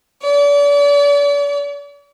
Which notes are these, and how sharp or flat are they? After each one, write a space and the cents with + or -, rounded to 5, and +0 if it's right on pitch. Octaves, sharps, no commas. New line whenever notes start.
D5 -40